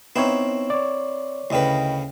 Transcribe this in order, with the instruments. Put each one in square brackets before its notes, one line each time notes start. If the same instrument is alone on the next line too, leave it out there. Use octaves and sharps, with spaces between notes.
[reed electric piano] B3 D#4 C#5 [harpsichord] C4 E4
[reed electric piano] C#5 D5
[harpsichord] D2 C#3 B4 [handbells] E4 D#5 G5